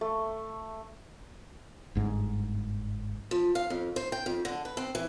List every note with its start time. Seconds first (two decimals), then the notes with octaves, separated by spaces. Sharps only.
0.01 A3
1.95 G1 G#2
3.31 F3
3.55 F5
3.70 F2
3.96 C5
4.12 G5
4.26 F2
4.45 D3
4.65 B4
4.77 C4
4.95 E3